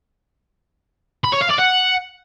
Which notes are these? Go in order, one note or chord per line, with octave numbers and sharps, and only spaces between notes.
B5
C#5
F5
D5
F#5